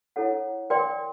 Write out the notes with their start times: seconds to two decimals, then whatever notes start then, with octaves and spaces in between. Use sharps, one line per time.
0.16 E4 A4 C#5 F#5
0.70 A#4 D5 G5 C6